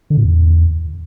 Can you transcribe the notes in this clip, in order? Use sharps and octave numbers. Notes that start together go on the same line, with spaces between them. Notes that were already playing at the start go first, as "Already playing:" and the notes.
D3
A2
E2